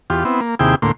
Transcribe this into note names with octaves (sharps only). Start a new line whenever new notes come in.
E2 F4 G4
B3 C4 E4
A#3
D#2 C3 E4 G#4 G5
D2 A2 A#3 C6